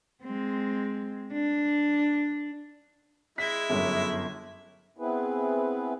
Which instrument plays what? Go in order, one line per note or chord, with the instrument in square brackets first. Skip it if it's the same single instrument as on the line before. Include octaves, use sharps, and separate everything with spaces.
[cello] G#3 C4
D4
[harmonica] G#3 E4 [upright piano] B6
[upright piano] G1 F#2
[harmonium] B3 C4 E4 G#4 B4